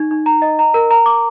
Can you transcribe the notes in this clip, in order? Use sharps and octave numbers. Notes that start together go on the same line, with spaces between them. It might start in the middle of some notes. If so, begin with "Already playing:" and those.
Already playing: D#4
D#4
A#5
D#5
A#5
A#4
A#5
D6